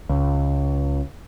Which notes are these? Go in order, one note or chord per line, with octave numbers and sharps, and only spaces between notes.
C#2